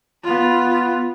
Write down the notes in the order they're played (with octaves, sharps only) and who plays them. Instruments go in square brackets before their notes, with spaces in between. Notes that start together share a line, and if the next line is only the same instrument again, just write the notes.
[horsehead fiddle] B3 F4